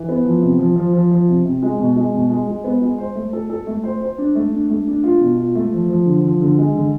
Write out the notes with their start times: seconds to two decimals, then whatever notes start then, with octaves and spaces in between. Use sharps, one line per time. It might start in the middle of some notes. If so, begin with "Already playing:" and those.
Already playing: E3
0.09 B3
0.25 F3
0.42 C3
0.59 F3
0.76 F3
0.93 F3
1.11 F3
1.28 C3
1.45 C3
1.62 G#3
1.79 B2
1.96 G#3
2.14 B2
2.30 G#3
2.47 G#3
2.64 B3
2.81 G#3
2.98 C5
3.15 A3
3.33 A4
3.50 A4
3.67 A3
3.84 C5
4.01 C5
4.18 D4
4.35 A3
4.52 D4
4.70 A3
4.87 D4
5.04 F4
5.21 B2
5.37 F4
5.55 A3
5.73 F3
5.89 F3
6.06 D3
6.24 F3
6.41 D3
6.58 G#3
6.75 D3